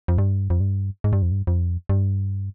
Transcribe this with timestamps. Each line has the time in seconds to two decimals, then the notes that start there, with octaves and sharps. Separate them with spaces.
0.08 F2
0.18 G2
0.50 F2
0.60 G2
1.04 G#2
1.13 G2
1.22 F2
1.32 G2
1.47 F2
1.89 G2